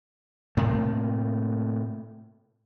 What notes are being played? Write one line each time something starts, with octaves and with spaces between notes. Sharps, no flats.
A2 C3 A3 A#3